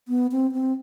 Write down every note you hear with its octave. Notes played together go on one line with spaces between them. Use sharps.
B3
C4
C4